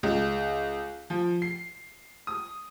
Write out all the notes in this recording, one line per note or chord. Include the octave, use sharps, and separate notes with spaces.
C#2
F3
C7
D#6